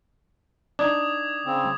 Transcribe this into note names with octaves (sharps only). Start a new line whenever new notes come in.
D4 D#4 D6 D#6 G#6
C#3 C4